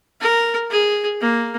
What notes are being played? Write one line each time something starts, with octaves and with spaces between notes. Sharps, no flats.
A#4
G#4
A#3